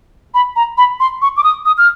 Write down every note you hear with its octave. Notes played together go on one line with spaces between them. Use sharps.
B5
A#5
B5
C6
C#6
D6
D#6
D#6
F6